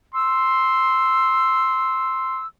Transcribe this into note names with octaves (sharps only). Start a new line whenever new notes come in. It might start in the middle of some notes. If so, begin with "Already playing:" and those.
C6 E6